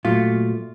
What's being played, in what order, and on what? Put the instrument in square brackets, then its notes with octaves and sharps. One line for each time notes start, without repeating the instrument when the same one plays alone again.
[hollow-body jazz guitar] A#2 F#3 A3 F4